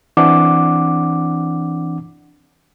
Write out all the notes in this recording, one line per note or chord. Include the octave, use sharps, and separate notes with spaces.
E3 C4 D4 F#5 D6